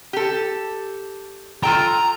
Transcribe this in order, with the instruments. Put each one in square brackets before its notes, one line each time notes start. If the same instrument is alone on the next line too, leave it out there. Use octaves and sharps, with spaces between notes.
[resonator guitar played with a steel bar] G4 A4
[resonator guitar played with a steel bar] F4 A4 G5 [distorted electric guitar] A#5